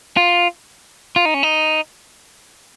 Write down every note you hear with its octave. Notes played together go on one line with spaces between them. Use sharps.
F4
F4
D#4
C#4
D#4